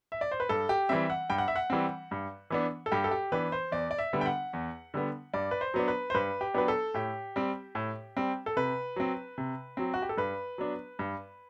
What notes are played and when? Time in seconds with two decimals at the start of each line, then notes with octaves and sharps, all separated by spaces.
0.12 E5
0.21 D5
0.31 C5
0.40 B4
0.49 G2 A4
0.69 G4
0.89 E3 G3 C4 E5
1.10 F#5
1.30 G2 G5
1.38 F#5
1.48 E5
1.56 F#5
1.70 E3 G3 C4
2.11 G2
2.50 E3 B3 D4
2.86 A4
2.92 G2 G4
3.04 A4
3.11 G4
3.32 E3 B3 D4 B4
3.52 C5
3.72 E2 D5
3.91 D5
3.98 E5
4.13 D3 G3 B3
4.21 G5
4.26 F#5
4.53 E2
4.94 D3 G3 B3
5.34 G2 D5
5.51 B4
5.61 C5
5.74 F#3 B3 D4
5.88 B4
6.10 C5
6.14 G2 B4
6.41 G4
6.54 F#3 B3 D4 B4
6.68 A4
6.94 A2 G4
7.36 G3 C4
7.75 A2
8.17 G3 C4
8.46 A4
8.56 C3 B4
8.96 F#3 C4
9.38 C3
9.77 F#3 C4
9.94 F#4
10.02 G4
10.09 A4
10.17 G2 B4
10.58 F#3 B3 D4
10.99 G2